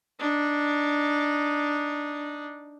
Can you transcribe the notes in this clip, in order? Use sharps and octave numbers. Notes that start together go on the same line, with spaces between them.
D4 D#4